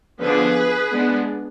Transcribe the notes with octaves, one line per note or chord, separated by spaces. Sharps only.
D3 F3 B3 D4 G#4 B4
G#3 B3 D4